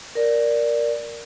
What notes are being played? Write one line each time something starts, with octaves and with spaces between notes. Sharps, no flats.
A#4 D5